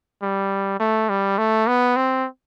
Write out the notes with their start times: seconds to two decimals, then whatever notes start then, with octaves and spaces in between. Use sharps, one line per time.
0.22 G3
0.80 A3
1.09 G3
1.38 A3
1.67 B3
1.96 C4